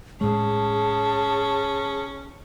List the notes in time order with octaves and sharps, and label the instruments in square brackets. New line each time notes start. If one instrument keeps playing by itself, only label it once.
[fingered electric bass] A2 G#3 [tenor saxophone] C#4 [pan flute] G#4 [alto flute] A5